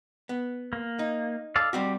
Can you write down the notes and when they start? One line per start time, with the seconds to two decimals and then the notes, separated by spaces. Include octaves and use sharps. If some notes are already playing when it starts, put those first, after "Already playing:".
0.29 B3
0.73 A#3
0.99 D#4
1.56 A4 D5 F5
1.73 G3 C4 F#4 G4